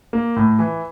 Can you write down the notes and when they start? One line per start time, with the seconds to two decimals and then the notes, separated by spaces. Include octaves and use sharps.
0.13 A#3
0.36 A2
0.59 E3